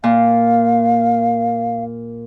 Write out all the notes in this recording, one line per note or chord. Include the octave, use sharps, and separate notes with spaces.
A#2 F5